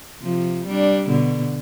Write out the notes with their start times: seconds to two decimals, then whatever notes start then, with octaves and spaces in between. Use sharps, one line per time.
0.22 C3 F3
0.66 G3 D4
1.09 B2 D3